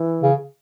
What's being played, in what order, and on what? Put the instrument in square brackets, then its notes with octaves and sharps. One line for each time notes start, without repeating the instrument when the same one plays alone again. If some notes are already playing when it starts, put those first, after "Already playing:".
Already playing: [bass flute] E3
[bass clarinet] C#3